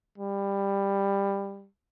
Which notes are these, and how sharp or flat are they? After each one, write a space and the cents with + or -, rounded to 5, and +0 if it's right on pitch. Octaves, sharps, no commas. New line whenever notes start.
G3 +15